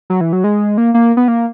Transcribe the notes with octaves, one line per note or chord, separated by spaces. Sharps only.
F#3
E3
F#3
G#3
A#3
A#3
B3
A#3